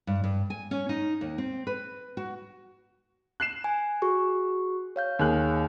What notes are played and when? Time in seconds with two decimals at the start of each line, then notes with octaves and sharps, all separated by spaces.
0.07 G2
0.24 G2
0.50 G#5
0.71 C#4
0.89 D#4
1.21 D#2
1.38 C4
1.67 B4
2.17 F#4
3.40 F#6 C7 E7
3.64 G#5
4.02 F#4 G#4 C#6
4.96 C#5 F5 G6
5.19 D#2 G#4 F#6